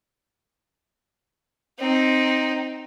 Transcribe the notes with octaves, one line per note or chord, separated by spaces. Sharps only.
C4 D#4